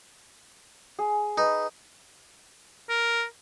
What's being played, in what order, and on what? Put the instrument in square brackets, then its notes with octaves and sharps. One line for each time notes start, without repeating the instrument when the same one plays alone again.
[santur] G#4
[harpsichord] D#4 [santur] B4
[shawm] A#4